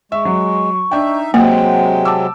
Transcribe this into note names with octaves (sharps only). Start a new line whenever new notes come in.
G#3 E5 C#6
F#3
D4 D#4 E5 G5
C3 F#3 G#3 A#3 F#5 G5
A5 D6 E6